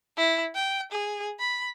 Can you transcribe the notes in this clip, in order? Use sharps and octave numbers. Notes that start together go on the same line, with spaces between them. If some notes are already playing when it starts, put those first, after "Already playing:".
E4
G5
G#4
B5